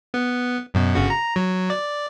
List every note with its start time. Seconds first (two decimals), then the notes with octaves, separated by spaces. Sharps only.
0.14 B3
0.74 F#2 B2
0.95 G1 C#3 F#4
1.10 A#5
1.36 F#3
1.70 D5